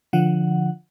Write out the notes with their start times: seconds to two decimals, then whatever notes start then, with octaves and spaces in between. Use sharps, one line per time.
0.13 D3 F3 F#5